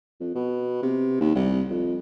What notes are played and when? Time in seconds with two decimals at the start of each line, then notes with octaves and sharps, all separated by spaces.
0.20 F2
0.35 B2
0.83 C3
1.21 D#2
1.35 C2
1.70 F2